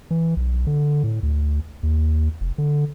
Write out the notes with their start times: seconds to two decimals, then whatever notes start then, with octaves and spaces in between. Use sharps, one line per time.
0.11 E3
0.37 B1
0.67 D3
1.04 A2
1.23 D2
1.83 D#2
2.41 F1
2.58 D3